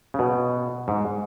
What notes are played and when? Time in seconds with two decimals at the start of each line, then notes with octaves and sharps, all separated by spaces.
0.14 C#3
0.19 B2
0.88 G#2